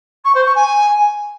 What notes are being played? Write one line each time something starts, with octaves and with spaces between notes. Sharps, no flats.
C#6
C5
C#6
G#5